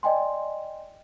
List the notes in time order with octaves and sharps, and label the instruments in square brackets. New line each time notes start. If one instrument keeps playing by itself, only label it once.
[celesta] D5 D#5 G5 G#5 C6